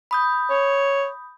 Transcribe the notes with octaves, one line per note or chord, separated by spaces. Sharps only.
B5 D#6 G6
C#5